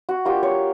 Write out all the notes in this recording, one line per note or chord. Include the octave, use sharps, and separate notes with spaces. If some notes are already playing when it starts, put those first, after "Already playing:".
F#4
A#3 D4 F4 G4
C#5